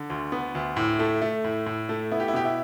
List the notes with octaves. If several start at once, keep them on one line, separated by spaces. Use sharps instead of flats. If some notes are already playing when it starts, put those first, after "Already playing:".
Already playing: D3
D2
B3
D2
A2
A3
A3
A2
A2
A3
B3 E4
G4
E4
B2 G4
E4